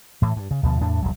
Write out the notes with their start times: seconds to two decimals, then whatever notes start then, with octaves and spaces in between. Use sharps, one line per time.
0.22 A2 E3
0.36 G2
0.51 C#3
0.63 D2 B2 F3
0.80 E2 A2 D4
1.02 D#1 C2 F#3